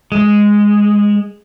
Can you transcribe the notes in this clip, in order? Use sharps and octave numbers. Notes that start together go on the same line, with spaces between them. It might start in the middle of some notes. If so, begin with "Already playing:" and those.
G#3